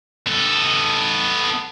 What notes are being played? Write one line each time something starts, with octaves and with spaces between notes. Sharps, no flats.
B3 A4